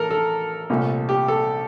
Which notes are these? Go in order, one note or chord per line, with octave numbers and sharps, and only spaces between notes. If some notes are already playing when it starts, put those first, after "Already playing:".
Already playing: A1 A4 A#4
A4
C2 A#2 A3
G4
A4